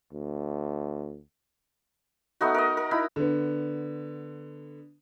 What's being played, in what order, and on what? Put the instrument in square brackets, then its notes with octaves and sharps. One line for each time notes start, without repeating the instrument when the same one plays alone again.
[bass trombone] D2
[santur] A3 B3 D#4 F#4
A#4 D#5
A#4
D#4 E4 F#5 B5
[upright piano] D3 B3